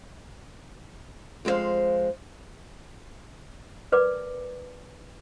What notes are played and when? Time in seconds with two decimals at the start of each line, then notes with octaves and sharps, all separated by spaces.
1.45 F2 G#3 F4 C5 F5
3.92 A#4 B4 D5 D6